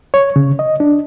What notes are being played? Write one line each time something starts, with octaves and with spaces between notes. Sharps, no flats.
C#5
C#3
D#5
D4